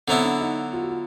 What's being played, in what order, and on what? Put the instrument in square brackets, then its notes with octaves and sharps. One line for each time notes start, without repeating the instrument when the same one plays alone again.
[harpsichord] D3 F#3 B3 E4 [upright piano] C4
[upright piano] D4
D#4
F4
F#4
F4